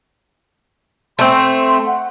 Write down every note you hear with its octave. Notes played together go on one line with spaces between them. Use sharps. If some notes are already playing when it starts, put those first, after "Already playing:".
A3 C4 C6
C6
F#5